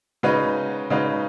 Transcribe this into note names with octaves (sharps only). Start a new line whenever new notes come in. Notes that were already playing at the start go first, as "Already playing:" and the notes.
C#3 G#3 D#4 F#4 B4
C#3 G#3 D#4 F#4 B4